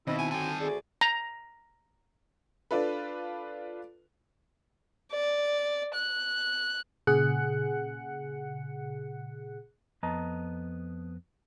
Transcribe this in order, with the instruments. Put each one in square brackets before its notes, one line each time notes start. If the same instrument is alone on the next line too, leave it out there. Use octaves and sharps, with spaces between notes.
[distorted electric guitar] B2 [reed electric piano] D#3 C4 D#4 [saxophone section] E4 [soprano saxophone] D#5
[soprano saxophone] G#5
[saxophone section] D3 F#3 [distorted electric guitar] A4 G5 [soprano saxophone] G#5
[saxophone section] D2 G#4 [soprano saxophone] D5
[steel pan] A#5
[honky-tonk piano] D4 F4 A4 B4
[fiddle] D5
F#6
[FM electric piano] A#2 C#3 G#4 F#5 F#6 C#7
[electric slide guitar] F2 B3 D#5 A5 A#5